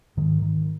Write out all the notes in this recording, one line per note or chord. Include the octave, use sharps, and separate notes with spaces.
G#2 D#3
D#3